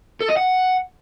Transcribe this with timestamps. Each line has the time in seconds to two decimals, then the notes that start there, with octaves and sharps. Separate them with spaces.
0.21 A4
0.29 D#5
0.37 F#5